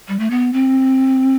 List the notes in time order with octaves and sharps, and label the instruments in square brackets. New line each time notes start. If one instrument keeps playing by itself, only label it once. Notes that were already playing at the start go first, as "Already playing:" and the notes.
[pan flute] G3
A3
B3
C4